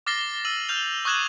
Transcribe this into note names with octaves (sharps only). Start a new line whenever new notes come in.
D6 F6 A6 A#6 C7 G7
E6 D#7 F#7
F6 G6 F7
C#6 D#6 F#6 G#6 E7 F#7